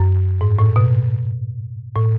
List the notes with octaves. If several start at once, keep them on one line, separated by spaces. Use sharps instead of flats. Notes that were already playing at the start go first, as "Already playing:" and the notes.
Already playing: F#2
G#2
A2
B2
A2